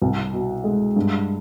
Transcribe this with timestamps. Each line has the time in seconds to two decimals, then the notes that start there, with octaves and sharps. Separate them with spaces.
0.02 C2
0.33 B2
0.64 G#3
0.96 G2